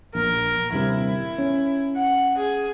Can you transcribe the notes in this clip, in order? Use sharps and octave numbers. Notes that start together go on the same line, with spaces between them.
A#1 A#4
D#1 G2 C3 E4
C#4
F#5
G#4